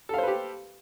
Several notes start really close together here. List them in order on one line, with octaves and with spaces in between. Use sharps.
A4 F5 C5 B4 G4